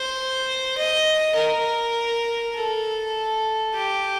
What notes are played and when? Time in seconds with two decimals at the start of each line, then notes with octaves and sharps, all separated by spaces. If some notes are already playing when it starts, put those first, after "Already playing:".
Already playing: C5
0.77 D#5
1.35 A#4
2.55 A4
3.74 G4